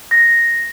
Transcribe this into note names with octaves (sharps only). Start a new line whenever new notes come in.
A#6